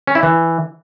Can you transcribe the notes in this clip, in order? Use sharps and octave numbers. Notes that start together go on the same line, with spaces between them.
C#4
E4
E3